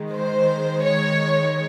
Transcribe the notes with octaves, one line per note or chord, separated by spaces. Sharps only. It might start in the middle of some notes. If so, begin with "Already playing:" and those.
Already playing: D#3 G#3
C5
C#5